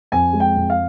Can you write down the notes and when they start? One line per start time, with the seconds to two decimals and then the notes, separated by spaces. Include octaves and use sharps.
0.12 F2 G#5
0.33 G#3
0.40 G5
0.56 F2
0.70 F5